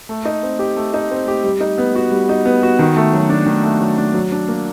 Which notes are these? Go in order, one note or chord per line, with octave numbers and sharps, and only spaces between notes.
A3
D#4
C4
G4
A3
D#4
C4
G4
G3
D#4
B3
F#4
G3
D#4
B3
F#4
D#3
A3
F#3
D4
D#3
A3
F#3
D4
F#3
D4
A#3